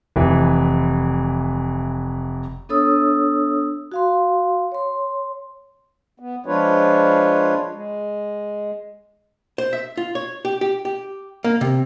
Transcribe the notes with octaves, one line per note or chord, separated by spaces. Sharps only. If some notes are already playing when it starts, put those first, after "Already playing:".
F1 E3
B3 D4 A4 C#5 D#6 E6
F#4 F5 C6
C#5 C6
B3
F3 G#3 D4 F4 B4 C#5
G#3
C5
E5
F4
C#5
G4
G4
G4
A#3
C3